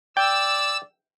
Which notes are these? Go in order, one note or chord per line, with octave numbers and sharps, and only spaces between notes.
D5 G5 E6